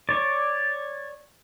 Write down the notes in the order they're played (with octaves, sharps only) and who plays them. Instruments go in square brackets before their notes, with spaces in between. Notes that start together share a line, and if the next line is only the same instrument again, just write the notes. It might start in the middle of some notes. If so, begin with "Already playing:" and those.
[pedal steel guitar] C#5 D5